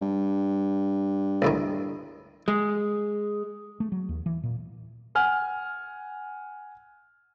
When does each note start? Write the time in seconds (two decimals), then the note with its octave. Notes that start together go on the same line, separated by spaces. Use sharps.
0.02 G2
1.42 C#2 A2 D#3
2.48 G#3
3.80 A3
3.92 F#3
4.09 D#2
4.26 E3
4.43 A#2
5.15 F#5 G#5 F6